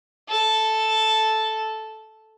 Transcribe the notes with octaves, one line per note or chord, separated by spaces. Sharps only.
A4